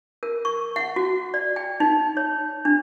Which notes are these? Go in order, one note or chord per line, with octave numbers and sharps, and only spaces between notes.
A#4
C#6
F#5
F#4
D5
G5
D#4
C#5
D4